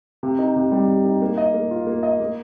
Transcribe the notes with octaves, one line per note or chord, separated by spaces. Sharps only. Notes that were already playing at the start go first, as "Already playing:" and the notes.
C3
D#4
C3
G3
C3
D#4
A#3
D#5
A#3
F4
A#3
D#5
A#3